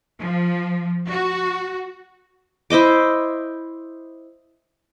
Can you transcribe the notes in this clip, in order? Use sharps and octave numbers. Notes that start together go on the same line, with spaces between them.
F3
F#4
E4 C5 D#5 D6